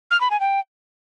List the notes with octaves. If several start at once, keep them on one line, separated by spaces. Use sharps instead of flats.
F6
B5
G#5
G5